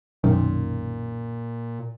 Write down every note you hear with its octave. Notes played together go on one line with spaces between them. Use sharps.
B1 F#2 A#2 D#3